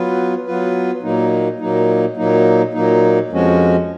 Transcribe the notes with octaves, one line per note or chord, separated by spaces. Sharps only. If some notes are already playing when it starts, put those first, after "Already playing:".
Already playing: F#3 B3 F4 B4
F#3 B3 F4 B4
A#2 F#3 A#3 D#4
A#2 F#3 A#3 D#4
A#2 F#3 A#3 D#4
A#2 F#3 A#3 D#4
F2 F3 G#3 C#4 F#4